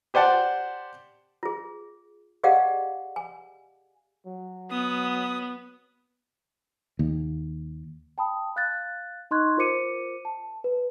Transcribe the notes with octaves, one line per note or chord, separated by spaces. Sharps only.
G4 C5 D5 F#5 A5
F4 G#4
G4 G#4 D5 D#5 F5 F#5
G#5
F#3
B3 D#6
D#2
G5 A5 B5 D#6
F5 F#6 G6 A6
D#4 D#5 C6 C#6 F#6 G#6
F4 A#4 C5 D6 C#7 D#7
A5
B4